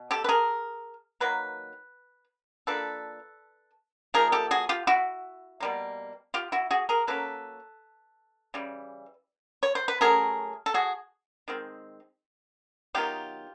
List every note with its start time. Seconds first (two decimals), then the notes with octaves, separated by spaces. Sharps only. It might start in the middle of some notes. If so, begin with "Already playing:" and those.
Already playing: B2
0.11 G4 A4
0.24 B4
0.29 G#4 A#4
1.20 D#3 F#3 A#3 B4
2.67 F3 A#3 D4 A4 B4
4.14 F3 A#3 D#4 G#4 A#4
4.32 G4 A4
4.51 F#4 G#4
4.69 F4 G4
4.87 E4 F#4
5.60 B2 G3 A#3
6.34 F4 G4
6.52 E4 F#4
6.71 F#4 G#4
6.89 G#4 A#4
7.07 F#3 A#3 C#4 A4 B4
8.54 C#3 E3 G3
9.63 C#5
9.75 C5
9.88 B4
10.01 F#3 A3 C#4 G#4 A#4
10.66 A4
10.74 F#4 G#4
11.48 D#3 G#3 C4
12.95 D#3 F#3 B3 D#4 F4 G4